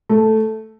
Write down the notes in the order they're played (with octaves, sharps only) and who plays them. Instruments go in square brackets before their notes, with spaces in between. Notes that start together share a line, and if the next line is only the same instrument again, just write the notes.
[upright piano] A3